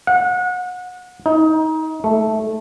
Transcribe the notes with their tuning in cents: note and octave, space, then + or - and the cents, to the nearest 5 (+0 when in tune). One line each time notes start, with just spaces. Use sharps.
F#5 -30
D#4 +25
A3 -5